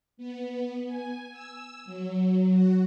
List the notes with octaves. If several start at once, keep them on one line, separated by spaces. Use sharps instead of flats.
B3
G#5
E6
F#3
F#4